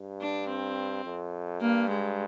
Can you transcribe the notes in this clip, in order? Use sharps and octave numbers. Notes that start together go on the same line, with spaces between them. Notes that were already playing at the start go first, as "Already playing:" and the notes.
Already playing: G2
D4
C4
F2
G2 A#3
G#3